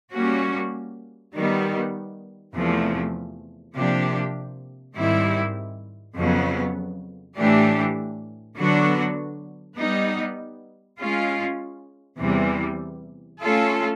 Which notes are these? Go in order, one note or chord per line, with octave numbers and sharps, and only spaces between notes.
G3 A#3 C#4 F#4
D#3 G3 B3
E2 C3 F3 A3
C3 F3 A#3 D4 G4
G#2 D#3 G3 C4 E4
F2 C#3 F#3 B3
A2 E3 A3 D4 G4
D3 F#3 B3 D4 F#4
G3 B3 D#4
G#3 C#4 F4
E2 C3 E3 G3
A3 C#4 F4 A4